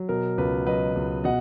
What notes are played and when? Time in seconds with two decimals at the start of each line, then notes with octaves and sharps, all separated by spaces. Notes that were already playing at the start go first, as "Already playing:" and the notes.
Already playing: F#3
0.09 B2 A#4
0.37 C#2 B4
0.67 F#3 B4 D#5
0.96 C#2
1.24 B2 D#5 F#5